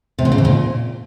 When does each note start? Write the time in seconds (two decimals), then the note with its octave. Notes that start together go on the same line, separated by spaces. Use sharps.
0.19 C3
0.25 A#2
0.32 C#3
0.38 F2
0.45 A#2